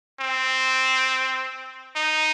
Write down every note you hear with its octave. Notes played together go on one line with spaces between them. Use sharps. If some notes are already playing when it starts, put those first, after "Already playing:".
C4
D#4